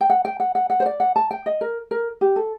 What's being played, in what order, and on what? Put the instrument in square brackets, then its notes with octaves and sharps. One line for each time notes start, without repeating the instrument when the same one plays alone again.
[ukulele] G5
F#5
G5
F#5
F#5
F#5
C5
D5
F#5
A5
G5
D#5
A#4
A#4
G4
A4